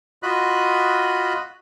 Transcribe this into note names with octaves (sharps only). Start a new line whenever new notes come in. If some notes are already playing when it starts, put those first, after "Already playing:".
F4 F#4 D#5 B5 F#6